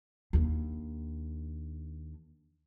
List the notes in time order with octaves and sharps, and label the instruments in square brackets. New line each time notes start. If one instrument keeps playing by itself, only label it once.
[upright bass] D#2 D4